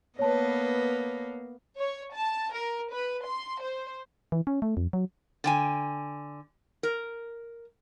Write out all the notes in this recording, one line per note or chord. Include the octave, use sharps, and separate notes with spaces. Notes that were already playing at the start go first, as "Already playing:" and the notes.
A#3 B3 B4 C#5 D#5 A5
C#5
A5
A#4
B4
C6
C5
E3
C#4
A3
F2
F#3
D3 G5 G#5
A#4